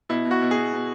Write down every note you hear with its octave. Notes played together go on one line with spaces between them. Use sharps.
B2 E4
B2
F#4
B2
G#4
B2
B2